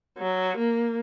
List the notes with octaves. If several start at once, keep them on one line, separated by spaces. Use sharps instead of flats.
F#3
A#3